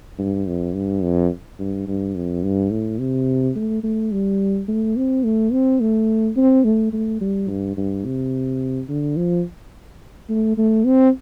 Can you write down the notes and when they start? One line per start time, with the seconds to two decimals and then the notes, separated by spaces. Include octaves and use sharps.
0.19 G2
0.47 F2
0.74 G2
1.03 F2
1.59 G2
1.87 G2
2.15 F2
2.43 G2
2.71 A2
2.99 C3
3.56 A3
3.83 A3
4.11 G3
4.68 A3
4.96 C4
5.24 A3
5.52 C4
5.80 A3
6.36 C4
6.64 A3
6.93 A3
7.21 G3
7.48 G2
7.77 G2
8.05 C3
8.89 D3
9.17 F3
10.29 A3
10.58 A3
10.85 C4